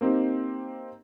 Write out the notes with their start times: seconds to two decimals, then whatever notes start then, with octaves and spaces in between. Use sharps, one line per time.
0.01 A#3 C4 D#4 G4